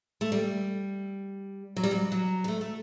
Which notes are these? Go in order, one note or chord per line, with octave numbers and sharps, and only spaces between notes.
A3
G3
F#3
G3
F#3
F#3
G3
A3
A3